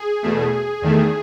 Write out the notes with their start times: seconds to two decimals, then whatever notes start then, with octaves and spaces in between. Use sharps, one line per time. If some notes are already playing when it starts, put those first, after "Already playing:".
Already playing: G#4
0.23 E2 B2 A3
0.82 E2 D#3 A3